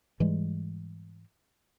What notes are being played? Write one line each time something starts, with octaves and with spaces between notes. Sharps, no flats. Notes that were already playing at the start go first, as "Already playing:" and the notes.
G#2 E3 G3 G#3